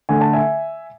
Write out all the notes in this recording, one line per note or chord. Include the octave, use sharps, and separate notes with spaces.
D3 A3 G#5
A5
E5 G#5